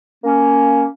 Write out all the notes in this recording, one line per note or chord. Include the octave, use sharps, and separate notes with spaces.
A#3 C#4